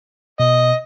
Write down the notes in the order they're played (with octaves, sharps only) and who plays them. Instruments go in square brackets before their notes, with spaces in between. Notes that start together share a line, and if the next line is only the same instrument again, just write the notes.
[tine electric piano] B2 [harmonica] D#5